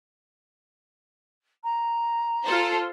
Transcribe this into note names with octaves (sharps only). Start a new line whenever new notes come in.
A#5
F4 A4 C5